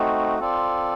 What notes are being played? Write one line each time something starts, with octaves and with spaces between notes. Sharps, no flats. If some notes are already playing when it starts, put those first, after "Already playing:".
Already playing: A3 C4 D#4 F#4
C4 F4 A4 D5